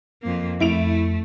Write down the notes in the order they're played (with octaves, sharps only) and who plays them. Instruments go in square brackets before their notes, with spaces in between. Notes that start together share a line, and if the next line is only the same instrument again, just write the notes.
[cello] F2 A#3
[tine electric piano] F2 [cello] A3 [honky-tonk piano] E4 D7 F7